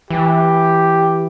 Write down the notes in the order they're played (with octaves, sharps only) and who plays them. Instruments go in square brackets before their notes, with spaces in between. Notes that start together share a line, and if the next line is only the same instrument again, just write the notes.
[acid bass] E3 [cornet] G4